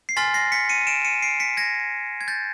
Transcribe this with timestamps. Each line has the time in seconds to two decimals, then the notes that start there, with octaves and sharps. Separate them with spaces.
0.09 C7
0.16 G#5 C6 F6 A6 B6
0.34 A#6 C7
0.52 B6 C#7
0.69 C#7 D#7
0.87 D7 E7
1.05 C#7 D#7
1.22 C7 D7
1.40 B6 C#7
1.57 G#6 A#6
2.21 G#6
2.28 G6 A6